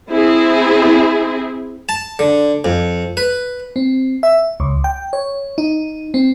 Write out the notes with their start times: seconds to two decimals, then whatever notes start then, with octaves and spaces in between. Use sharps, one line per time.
0.11 C4 E4 G#4
1.89 A5
2.19 D3
2.65 F2
3.17 B4
3.76 C4
4.23 E5
4.60 C#2
4.84 G5
5.13 C#5
5.58 D#4
6.14 C4